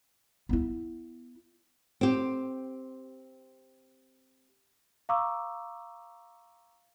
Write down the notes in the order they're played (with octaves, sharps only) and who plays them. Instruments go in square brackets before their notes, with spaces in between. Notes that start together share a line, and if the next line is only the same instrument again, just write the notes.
[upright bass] B3 E4
[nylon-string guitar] C4 G4
[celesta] F5 A#5 C#6 D6 E6